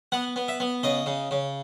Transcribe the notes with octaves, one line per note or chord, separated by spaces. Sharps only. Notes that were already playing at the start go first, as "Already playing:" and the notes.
B3 F#5
B3
E5
B3
C#3 D#5
C#3
C#3